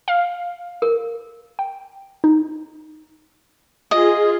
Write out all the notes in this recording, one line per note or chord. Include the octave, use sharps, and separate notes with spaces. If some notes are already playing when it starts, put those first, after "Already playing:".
F5
A#4
G5
D#4
F4 G#4 D#5